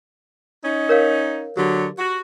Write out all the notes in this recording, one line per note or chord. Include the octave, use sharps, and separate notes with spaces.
C#4 D#4
A#4 C#5 F5
D3 F#3 G4
F#4